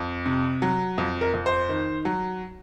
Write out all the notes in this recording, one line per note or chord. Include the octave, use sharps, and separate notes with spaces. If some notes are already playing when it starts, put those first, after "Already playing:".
Already playing: F2
C3
F#3
F2
A#4
F2
C5
D#3
F#3